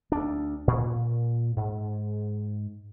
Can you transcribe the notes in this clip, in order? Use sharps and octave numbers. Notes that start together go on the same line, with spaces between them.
D2 D4
A#2
G#2